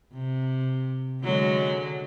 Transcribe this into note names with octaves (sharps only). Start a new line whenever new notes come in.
C3
D3 F#3 G#3